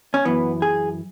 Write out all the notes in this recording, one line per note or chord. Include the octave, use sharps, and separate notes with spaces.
C#4
F#2 E3 B3
G#4